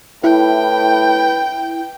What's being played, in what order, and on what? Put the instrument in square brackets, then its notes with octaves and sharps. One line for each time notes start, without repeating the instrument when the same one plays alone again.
[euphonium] A2 [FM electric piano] E4 [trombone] B4 [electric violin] G5